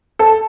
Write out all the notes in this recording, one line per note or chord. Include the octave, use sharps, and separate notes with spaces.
A4